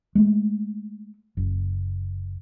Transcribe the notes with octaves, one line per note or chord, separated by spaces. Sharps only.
G#3 A3
F#1